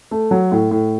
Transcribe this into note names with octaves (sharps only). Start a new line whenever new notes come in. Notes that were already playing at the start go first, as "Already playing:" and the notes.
A3
F#3
A2
A2